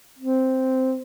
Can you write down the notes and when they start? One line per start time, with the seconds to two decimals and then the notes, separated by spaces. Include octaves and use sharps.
0.19 C4